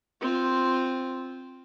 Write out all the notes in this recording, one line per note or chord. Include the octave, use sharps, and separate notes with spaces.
C4 F4